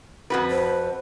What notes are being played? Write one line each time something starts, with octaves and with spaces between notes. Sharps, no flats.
F2 F#4 B4
C5